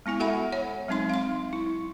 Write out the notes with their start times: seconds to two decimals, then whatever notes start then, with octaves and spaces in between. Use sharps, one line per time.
0.06 G#3 B3 E4 G#5
0.20 F#4 A4 E5 F#5 B5
0.52 C#5 F#5
0.88 F#3 G#3 C4 D#4 C6
1.10 F5 C6
1.53 E4